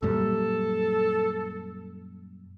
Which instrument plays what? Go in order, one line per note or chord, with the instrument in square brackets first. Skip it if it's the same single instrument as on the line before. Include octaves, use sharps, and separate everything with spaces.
[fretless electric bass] F#2 A#2 G3 [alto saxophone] A4